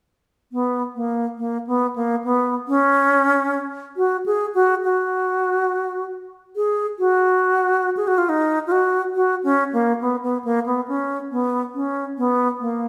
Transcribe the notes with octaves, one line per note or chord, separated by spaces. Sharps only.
B3
A#3
A#3
B3
A#3
B3
C#4
F#4
G#4
F#4
F#4
G#4
F#4
G#4
F#4
F4
D#4
F4
F#4
F#4
C#4
A#3
B3
B3
A#3
B3
C#4
B3
C#4
B3
A#3